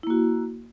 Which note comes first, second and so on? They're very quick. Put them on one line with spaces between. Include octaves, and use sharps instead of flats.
E4 A#3 F#4